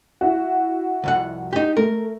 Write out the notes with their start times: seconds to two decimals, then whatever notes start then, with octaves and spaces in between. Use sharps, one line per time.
0.21 E4 F#4
1.04 C2 F2 F#5
1.53 D#4 G4
1.77 A3 A#4